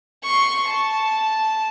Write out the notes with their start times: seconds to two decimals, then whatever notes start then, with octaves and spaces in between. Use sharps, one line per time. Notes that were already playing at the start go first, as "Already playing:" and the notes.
0.24 C6 C#6
0.67 A5